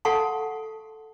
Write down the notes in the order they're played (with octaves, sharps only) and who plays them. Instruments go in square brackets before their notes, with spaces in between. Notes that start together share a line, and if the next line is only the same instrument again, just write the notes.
[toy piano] A4 F5 F#5 A5 C6 C#6